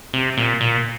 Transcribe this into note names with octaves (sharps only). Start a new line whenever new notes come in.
C3
A#2
A#2